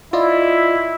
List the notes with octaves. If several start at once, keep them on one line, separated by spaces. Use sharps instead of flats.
E4 F4 D5 D#5